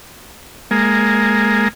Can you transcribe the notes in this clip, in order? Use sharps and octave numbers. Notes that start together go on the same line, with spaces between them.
G#3 A#3